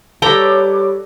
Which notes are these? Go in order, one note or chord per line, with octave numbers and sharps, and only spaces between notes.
G3 A4 B4 C#5 G5 A#5 D6